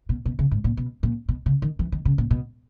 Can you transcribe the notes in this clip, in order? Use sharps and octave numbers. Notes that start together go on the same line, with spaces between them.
B2
B2
C#3
G#2
A#2
B2
A#2
B2
C#3
D#3
E3
D#3
C#3
A#2
B2